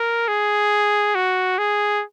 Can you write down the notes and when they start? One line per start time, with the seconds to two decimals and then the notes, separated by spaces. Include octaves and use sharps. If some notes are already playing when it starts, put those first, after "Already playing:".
Already playing: A#4
0.28 G#4
1.15 F#4
1.58 G#4